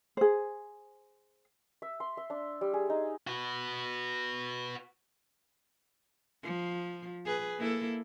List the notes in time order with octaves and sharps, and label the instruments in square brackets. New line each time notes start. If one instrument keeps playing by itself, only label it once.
[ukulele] G#4 C5
[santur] E5
C6
E5
D4
G3
G#4
D#4
[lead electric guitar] F#4 B4
[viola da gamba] F3
G#4 B4
A#3 E4 A4